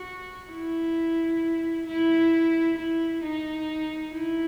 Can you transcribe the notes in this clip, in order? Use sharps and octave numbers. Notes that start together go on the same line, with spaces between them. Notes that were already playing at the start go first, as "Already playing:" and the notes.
Already playing: F#4
E4
E4
E4
D#4
E4